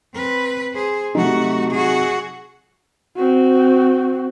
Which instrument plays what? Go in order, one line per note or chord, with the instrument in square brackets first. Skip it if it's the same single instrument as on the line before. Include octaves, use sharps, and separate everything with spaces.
[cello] C4 B4
G#4 C5
[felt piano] C3 F#3 D#4 [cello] A3 F#4
[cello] F#4 G#4
[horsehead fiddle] C4 F#4